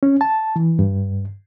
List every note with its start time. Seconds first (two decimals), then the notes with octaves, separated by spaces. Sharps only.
0.03 C#4
0.21 A5
0.56 E3
0.79 G2